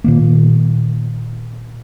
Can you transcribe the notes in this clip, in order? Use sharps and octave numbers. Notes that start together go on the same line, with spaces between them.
A#2 D#3 A#3